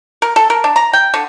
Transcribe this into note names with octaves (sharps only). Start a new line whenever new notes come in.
A#4
A4
A#4
D4
A#5
G5
D3